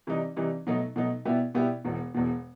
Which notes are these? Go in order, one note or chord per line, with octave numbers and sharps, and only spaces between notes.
C3 E3 G3 D#4
C3 E3 G3 D#4
B2 F#3 A3 D#4
B2 F#3 A3 D#4
B2 G3 B3 E4 G4
B2 G3 B3 E4 G4
E1 E2 B2
E1 E2 B2